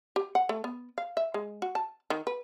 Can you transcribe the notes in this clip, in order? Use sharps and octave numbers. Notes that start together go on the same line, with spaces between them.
G4
F#5
A3
B3
F5
E5
G#3
F#4
A5
D#3
B4